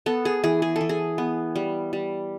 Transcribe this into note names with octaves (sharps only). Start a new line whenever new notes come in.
B3 A4
G#4
E3 G#4
G#4
A4
E3
G#4
B3
G3
G3